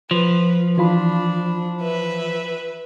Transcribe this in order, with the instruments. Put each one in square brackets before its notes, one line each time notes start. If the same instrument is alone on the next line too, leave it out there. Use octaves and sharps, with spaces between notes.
[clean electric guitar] F3 [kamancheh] B4
[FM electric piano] E3 F4 B5 [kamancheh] D4
[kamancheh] B4 E5